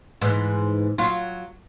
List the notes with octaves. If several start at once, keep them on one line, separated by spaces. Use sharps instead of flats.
G#2 E3
F#3 F4